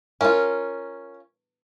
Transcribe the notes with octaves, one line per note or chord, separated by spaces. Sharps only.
C#4 F4 A#4